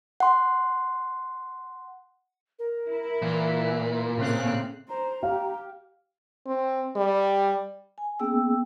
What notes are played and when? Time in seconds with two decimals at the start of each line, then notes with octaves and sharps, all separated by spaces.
0.20 F#5 C6
2.59 A#4
2.89 E4
3.22 A#2 E3
4.17 A2 C#3 A#3 C4 F5 F#6
4.89 C5 A#5
5.23 G4 F5
6.47 C4
6.96 G3
7.98 G#5
8.20 A#3 B3 C#4 G#4 G5 E6